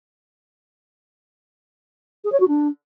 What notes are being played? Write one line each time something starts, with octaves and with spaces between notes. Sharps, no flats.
G#4
C#5
F#4
D4